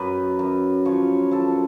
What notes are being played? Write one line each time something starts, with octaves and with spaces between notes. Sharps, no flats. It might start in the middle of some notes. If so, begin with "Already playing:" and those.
Already playing: F#2 B4
F#2
F3 C#5
F3 A4